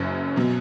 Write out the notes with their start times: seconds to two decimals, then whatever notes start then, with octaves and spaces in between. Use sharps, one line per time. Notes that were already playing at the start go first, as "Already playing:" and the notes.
Already playing: F#1 F#2 C#3 F#3 C#4
0.36 B2 F#3